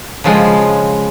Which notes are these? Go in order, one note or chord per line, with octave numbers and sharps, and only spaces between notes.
C#3 F3 G#3